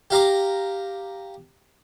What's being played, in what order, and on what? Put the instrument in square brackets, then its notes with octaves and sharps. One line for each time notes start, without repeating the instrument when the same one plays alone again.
[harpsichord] G4 F5 A#5 D6